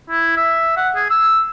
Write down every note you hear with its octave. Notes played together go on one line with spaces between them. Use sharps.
E4
E5
F#5
G#4
E6